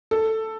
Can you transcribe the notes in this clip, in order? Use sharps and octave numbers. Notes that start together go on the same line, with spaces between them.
A4